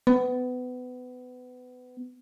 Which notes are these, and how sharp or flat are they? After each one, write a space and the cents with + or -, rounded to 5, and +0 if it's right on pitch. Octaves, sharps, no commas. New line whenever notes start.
B3 +25